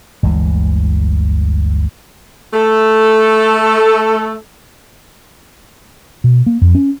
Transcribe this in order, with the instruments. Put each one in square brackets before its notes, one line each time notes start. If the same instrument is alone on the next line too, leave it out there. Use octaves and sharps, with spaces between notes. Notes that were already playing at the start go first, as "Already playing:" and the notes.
[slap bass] G1 D2 E3 G#3
[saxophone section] A3 A4
[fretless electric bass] B2
A#3
F2
C#4